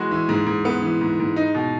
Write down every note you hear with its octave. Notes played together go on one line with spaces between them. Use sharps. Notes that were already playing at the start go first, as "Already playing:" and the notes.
Already playing: E3 G#3 B3 F#4
E3
G#2
G#2
B3
E3
G#2
G#2
D#4
B2